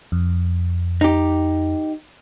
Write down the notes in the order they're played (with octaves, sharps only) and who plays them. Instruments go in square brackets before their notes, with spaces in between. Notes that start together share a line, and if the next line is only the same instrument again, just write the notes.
[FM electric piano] F2
[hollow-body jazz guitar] D#4 G4